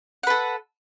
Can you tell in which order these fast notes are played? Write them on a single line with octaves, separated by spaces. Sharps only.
F#5 B4 A4